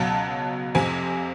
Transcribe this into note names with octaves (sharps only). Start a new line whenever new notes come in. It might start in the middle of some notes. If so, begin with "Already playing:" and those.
Already playing: C#2 B2 F#3 A5
F2 C3 F3 G#5